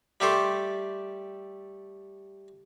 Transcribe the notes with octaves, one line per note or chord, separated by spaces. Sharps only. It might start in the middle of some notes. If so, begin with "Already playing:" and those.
G3 A3 G4 A4 C6